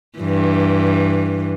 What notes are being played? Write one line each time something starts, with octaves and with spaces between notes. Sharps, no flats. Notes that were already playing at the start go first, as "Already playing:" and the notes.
G2 E3